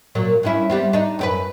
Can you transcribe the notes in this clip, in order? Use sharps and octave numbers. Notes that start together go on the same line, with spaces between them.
A#2 F#3 A#3
G2 C#4 E4
G3 B3 C4
D4 D#4
F#2 G4 B4